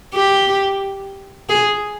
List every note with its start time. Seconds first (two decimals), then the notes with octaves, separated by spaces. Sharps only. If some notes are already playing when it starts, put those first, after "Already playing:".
0.15 G4
1.49 G#4